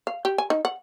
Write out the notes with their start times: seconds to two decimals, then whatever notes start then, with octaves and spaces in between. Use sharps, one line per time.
0.07 F5
0.25 G4
0.38 G#5
0.50 D#4
0.65 F#5